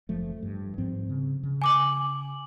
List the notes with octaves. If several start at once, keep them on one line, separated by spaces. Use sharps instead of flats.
F#1 F3 A3
G2
G#2 F3 C4
C#3
C#3
G#5 D6 F#7